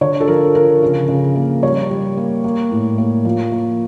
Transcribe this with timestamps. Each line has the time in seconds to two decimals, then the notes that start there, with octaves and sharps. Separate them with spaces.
0.01 D3 C#5
0.21 A4
0.28 F3 A#4
0.55 F3 A#4
0.82 C#3
1.09 C#3
1.36 A#3
1.63 G3 C#5
1.90 G3
2.17 A#3
2.44 A#3
2.72 A2
2.98 A#3
3.25 F3
3.52 A#3